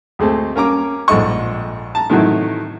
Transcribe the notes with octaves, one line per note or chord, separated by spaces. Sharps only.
D2 G#3 A3 C4
A#3 C#4 A#5 D6
A#1 G#2 A4 D#5 C#6
A5 A#5
A2 C3 D#3 E3 F#3